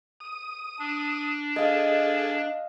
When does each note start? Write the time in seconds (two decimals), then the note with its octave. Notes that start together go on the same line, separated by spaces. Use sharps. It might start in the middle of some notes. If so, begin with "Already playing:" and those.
0.20 D#6
0.79 D4
1.56 G#4 A4 D#5 F5